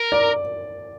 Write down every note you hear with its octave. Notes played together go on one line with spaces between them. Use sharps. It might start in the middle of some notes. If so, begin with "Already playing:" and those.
Already playing: A#4
D5